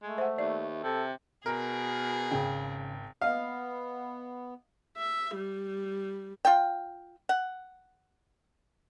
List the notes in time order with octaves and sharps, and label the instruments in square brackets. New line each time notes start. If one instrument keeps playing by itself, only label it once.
[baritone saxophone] G#3 [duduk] A3
[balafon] C5 F#5 [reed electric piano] E5
[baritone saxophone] D#2 [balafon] D5
[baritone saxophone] C3 [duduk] A4
[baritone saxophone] B2 [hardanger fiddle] G#4 [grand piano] A#4
[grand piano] G#1 G5 [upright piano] C#3
[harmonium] B3 [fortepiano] D#5 F5
[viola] E5
G3
[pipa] F4 G5
F#5